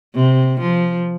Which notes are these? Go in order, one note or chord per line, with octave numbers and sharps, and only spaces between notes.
C3
F3